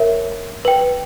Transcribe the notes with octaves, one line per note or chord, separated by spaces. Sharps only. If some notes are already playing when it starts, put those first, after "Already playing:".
Already playing: A#4 C#5 E5
B4 G5